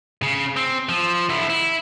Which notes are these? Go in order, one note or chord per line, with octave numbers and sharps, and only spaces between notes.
C#3
C4
F3
D3 E4
E4